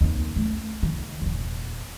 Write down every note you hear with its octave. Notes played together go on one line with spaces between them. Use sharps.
D#2 C4
A3 C#4
D#3
D#1 E2